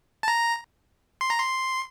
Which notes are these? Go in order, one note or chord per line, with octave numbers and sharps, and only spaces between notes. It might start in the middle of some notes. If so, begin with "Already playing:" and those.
A5
A#5
C6
A#5
C6